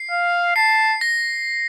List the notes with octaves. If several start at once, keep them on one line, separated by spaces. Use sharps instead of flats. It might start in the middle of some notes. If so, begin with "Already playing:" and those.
Already playing: C7
F5
A5 C7
A#6